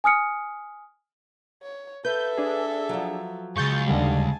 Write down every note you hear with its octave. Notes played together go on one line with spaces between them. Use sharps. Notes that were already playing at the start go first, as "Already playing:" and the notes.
G#5 D#6 F6 C#7
C#5
A4 B4 E5 G6
D4 G#4
F3 F#3
C#2 G2 G#4 C#6 G6 A6
D#2 D3 G3 G#5 A5